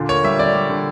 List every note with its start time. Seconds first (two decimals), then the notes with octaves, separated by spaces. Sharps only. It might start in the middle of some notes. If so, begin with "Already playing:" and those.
Already playing: A#2 D3
0.09 A#3 C#5
0.24 G3 E5
0.39 D3 D5
0.54 G3
0.70 D3